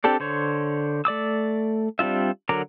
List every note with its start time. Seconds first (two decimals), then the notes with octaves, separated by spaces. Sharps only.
0.04 C4 D4 G4 A4 D5
0.20 D3 C5 C#5
1.05 A3 D5 D6 E6
1.99 G3 C4 D4 F4 E5
2.49 D3 F#3 A#4 A#5 D6